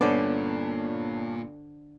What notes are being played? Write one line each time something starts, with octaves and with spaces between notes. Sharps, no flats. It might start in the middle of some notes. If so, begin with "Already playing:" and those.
G2 A#2 D3 B3 C#4 D4 C5 D5